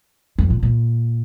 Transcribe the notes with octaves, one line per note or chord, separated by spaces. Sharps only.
F2
A#2
A#2